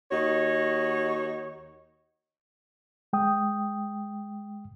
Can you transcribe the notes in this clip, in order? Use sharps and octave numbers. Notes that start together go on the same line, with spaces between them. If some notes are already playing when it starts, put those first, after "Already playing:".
D#2 D#4 F#4 C#5
G#3 G5 D#6